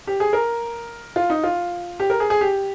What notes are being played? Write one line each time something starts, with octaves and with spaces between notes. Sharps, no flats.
G4
G#4
A#4
F4
D#4
F4
G4
A#4
G#4
G#4
G4